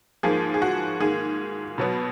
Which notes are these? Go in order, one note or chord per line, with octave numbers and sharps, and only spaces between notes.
G#2 F3 A#3 G#4
G#4
F#4
G#2 D#3 A#3 G#4
B2 F#3 B3